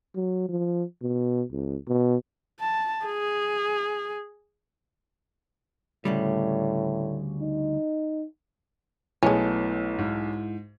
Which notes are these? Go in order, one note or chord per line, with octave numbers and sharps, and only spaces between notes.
F#3
F3
B2
C#2
B2
A5
G#4
D2 A2 C#3 G3
D#4
B1 G#3 A3 B3 C#4 E4 A5
G#2